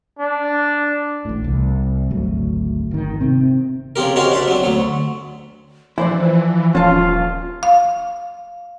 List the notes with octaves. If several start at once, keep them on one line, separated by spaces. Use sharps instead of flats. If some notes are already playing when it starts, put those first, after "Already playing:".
D4
A1 A2
C2
G#1 D2 F#3
G#1 D#3
C3 C4
C#3 F3 C4 G4 A#4
C#4 D#4 F#4 G4 A#4 C5
D4 C5 E5
F#3 C4
D2 F#3
E3 F3 E4 C5 D5
D#1 C#4 F4 A5
F5